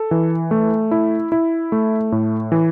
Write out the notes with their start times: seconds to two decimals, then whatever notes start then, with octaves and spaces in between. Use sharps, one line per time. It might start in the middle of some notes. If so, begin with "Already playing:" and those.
Already playing: A4
0.11 E3
0.51 A3
0.91 E4
1.32 E4
1.72 A3
2.12 A2
2.52 E3